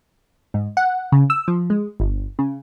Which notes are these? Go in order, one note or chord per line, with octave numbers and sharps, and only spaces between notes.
G#2
F#5
C#3
E6
F3
G#3
G1
C#3